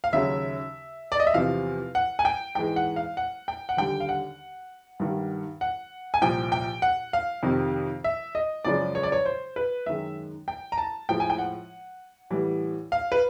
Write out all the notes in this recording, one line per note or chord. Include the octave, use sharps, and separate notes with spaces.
F5
D#2 C#3 F#3 E5
D5
D#5
E5
E2 C3 F3 F5
F#5
G#5
G5
G#2 E3 G#3 G5
F#5
F5
F#5
G5
F#5
D#2 D3 G3 G5
F5
F#5
G2 D#3 G3
F#5
G#5
C2 A#2 F3 G5
G5
F#5
F5
F2 C3 D#3
E5
D#5
F#2 C#3 F3 G#3 D5
C#5
D5
C#5
C5
B4
F#2 D#3 G#3 E5
G5
A#5
A5
A2 F3 G#3 G5
G#5
G5
F#5
A2 E3 G3
F5
B4